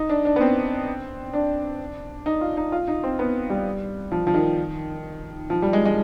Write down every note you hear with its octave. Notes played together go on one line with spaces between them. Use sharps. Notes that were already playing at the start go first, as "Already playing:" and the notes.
Already playing: D#4
D4
D4
B3
C4
D4
D#4
F4
D#4
F4
D#4
C4
B3
G3
F3
F3
D#3
F3
G3
G#3
G#3